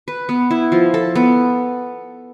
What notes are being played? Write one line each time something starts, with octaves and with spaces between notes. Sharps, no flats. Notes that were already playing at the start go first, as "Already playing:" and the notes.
B4
B3
E4
F3
A4
B3